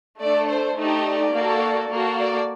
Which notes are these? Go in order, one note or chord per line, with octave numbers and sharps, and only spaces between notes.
A3 D4 A4 D5
C5
A3 D#4 G4
D5
A#3 F#4 A4
A#3 F#4 A4
D5